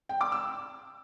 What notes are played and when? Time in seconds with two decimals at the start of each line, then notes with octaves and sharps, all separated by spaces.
0.09 G5
0.21 D6
0.32 E6